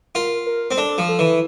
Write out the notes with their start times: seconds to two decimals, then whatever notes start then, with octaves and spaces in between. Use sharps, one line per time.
0.15 F4 A#4
0.46 A#4
0.71 C4
0.77 D4 A4
0.98 F3
1.09 A4
1.19 E3